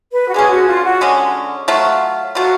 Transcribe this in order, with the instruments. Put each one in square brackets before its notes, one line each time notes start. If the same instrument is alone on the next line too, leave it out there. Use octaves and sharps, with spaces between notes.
[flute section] B4
F#4
[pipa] D3 G#3 C#4 [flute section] G#4
[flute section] F#4
F4
F#4
[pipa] D3 G#3 C#4
F#3 A3 F4
[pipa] F#3 A3 F4 [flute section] F#4